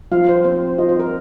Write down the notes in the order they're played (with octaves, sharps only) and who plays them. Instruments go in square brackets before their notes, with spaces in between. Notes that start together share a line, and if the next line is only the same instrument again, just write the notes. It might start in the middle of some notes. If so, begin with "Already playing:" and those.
[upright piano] F3 [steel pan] F5
[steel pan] C5
[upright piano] C4 [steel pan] C5
[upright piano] F4 [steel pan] D#5
[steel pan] C5
A#4